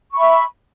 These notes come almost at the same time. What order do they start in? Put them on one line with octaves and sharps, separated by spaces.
C#6 B5 E5